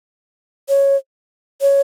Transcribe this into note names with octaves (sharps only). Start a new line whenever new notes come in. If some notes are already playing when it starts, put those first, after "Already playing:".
C#5
C#5